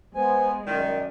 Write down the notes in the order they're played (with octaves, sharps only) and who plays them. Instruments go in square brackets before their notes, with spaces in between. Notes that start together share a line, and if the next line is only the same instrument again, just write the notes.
[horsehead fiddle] G#3 [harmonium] B3 G#5 [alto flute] C5
[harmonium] F#2 [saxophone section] D#3 [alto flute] D5